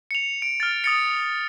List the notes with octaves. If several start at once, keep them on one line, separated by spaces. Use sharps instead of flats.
C#7 F7
D7
F6 A6
D#6 A6 C#7